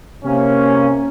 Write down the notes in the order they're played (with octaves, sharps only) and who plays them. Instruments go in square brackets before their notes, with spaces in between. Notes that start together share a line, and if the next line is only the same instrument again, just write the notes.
[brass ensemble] C3 A#3 C#4